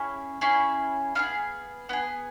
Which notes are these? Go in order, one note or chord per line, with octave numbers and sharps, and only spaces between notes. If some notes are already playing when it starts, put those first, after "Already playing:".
Already playing: C#4 E4 G#4
C#4 E4 G#4
B3 E4 G#4 F5
B3 E4 G#4